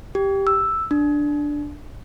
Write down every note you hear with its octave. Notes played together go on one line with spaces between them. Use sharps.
G4
E6
D4